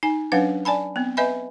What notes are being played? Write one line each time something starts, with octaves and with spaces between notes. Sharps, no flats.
D#4 G#5
F#3 C#4 D4 B4 F5 F#5
D5 G#5 A5 B5
B3 C4
B4 D#5 E5 G#5 B5